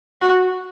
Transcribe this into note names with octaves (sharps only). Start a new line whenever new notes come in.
F#4